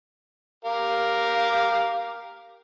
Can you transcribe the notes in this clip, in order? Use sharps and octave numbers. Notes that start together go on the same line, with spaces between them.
G4 A#4 F5